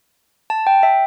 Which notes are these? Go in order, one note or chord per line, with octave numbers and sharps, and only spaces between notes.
A5
G5
E5